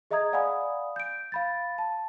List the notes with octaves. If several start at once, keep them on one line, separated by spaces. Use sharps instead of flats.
G#4 D#5 E5 A#5 D#6 G#6
D5 F5 F#5 G#5 B5 D#6
G6 D7
F5 B5 A6
A5